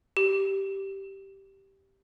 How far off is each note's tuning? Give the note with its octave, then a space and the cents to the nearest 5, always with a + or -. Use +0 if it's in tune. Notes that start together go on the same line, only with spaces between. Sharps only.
G4 -5